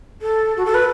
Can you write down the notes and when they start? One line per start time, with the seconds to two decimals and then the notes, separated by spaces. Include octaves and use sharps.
0.22 A4
0.57 F#4
0.66 A4
0.74 B4